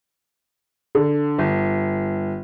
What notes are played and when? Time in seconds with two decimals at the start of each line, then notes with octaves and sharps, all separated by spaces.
0.95 D3
1.38 G1